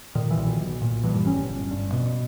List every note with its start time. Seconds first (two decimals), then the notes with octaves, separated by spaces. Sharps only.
0.15 A#2 D#3
0.31 E3
0.38 B1
0.60 B1
0.82 A#2
1.03 G2 E3
1.26 G1 C#4
1.49 G1
1.71 G2
1.92 B2